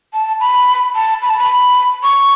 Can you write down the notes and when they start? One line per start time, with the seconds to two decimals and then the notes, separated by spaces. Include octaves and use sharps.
0.13 A5
0.40 B5
0.95 A5
1.22 B5
1.30 A5
1.39 B5
2.03 C#6